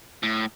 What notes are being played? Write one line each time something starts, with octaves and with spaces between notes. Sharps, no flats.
A2